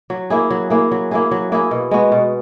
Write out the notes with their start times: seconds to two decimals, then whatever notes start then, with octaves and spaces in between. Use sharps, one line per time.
0.10 F#3
0.30 A#3 E4 G#4
0.51 F#3
0.70 A#3 E4 G#4
0.91 F#3
1.11 A#3 E4 G#4
1.31 F#3
1.52 A#3 E4 G#4
1.71 B2
1.91 G#3 B3 F#4
2.12 B2